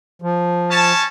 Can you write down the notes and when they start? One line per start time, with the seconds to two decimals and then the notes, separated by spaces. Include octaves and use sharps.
0.22 F3
0.69 C#4 A5